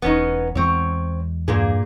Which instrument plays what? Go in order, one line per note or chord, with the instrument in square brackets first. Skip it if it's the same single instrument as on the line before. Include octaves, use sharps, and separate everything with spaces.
[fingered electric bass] E1 [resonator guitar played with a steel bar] B3 C#4 D#4
[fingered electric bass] E2 G#3 [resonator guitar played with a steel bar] C4 C#5
[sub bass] G2 [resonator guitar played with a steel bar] A#2 A#3 G#4